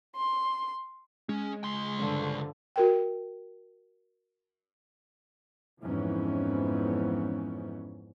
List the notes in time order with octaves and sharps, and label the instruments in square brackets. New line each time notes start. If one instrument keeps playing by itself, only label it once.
[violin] C6
[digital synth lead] G#3 [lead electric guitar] C#4
[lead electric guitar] C#2 C6
[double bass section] G2 D3 F3
[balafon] F#4 A#4 G5
[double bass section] F2 G#2 E3 F3 B3 C#4